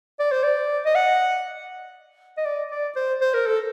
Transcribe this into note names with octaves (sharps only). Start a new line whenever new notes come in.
D5
C5
D5
D#5
F#5
D#5
D5
D5
C5
C5
A#4
A4